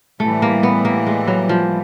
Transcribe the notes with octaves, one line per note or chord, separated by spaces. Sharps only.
A2 E3 G3 A3
A#3
B3
A#3
G#3
F#3
F3